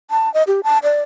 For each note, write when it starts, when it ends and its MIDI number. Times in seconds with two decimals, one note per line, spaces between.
0.11 0.32 81
0.34 0.43 75
0.47 0.61 67
0.64 0.78 81
0.83 1.02 74